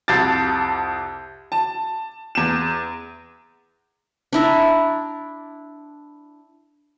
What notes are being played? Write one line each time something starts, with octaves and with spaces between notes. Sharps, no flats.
C2 F2 A6
A5
E2 E7
D4 E4 A#5